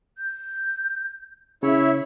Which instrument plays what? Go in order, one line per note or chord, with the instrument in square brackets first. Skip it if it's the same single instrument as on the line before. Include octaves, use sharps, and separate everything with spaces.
[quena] G6
[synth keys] C#3 [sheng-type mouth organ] E4 C#5 [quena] E5